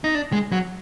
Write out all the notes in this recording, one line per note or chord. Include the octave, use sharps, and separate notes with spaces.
D#4
D4
G#3
F#3